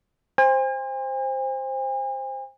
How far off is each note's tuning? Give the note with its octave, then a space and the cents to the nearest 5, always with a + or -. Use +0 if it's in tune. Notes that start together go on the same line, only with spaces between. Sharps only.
C5 +5 G#5 -45